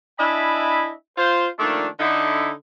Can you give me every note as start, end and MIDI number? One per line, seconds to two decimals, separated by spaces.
0.19 0.92 62
0.19 0.92 64
0.19 0.92 75
0.19 0.92 76
0.19 0.92 80
0.19 0.92 83
1.18 1.48 65
1.18 1.48 72
1.59 1.87 51
1.59 1.87 53
1.59 1.87 57
1.59 1.87 58
1.59 1.87 62
2.00 2.51 50
2.00 2.51 63
2.00 2.51 64